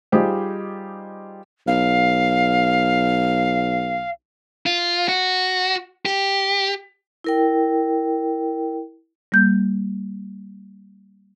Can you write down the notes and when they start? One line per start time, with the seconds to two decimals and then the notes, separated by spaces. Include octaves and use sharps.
0.12 G3 D#4 F4 G4 G#4 C5
1.67 B1 F5
4.66 F4
5.08 F#4
6.05 G4
7.24 E4 A#4 G5
9.32 G3 A#3 G6